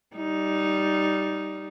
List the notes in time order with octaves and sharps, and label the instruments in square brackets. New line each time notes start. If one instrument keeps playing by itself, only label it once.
[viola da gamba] G3 D#4